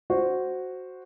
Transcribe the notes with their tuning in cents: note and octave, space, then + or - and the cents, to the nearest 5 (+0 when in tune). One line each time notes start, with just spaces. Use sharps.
F#4 +0 C5 +0